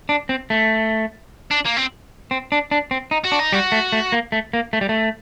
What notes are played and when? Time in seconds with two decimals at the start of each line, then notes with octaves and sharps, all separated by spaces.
0.09 D4
0.29 C4
0.50 A3
1.51 D4
1.66 A#3
1.77 C4
2.31 C4
2.52 D4
2.71 D4
2.91 C4
3.11 D#4
3.25 F#4
3.32 D4
3.40 D#4
3.52 G3 F#4
3.72 A3
3.92 A3
4.12 A#3
4.32 A3
4.53 A#3
4.73 A3
4.81 G3
4.89 A3